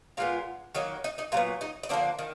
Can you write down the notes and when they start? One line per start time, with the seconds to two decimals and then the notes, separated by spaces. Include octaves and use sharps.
0.17 A#2 G#3 B3 F4 F5
0.75 D#3 F#3 A#3 D#4 D#5
1.04 D#4 D#5
1.18 D#4 D#5
1.32 A#2 F#3 B3 F4 F5
1.61 D#4 D#5
1.83 D#5
1.89 D3 F3 A#3 D4 D5
2.19 D#3